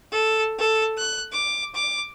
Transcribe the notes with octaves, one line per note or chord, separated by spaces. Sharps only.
A4
A4
F#6
D6
D6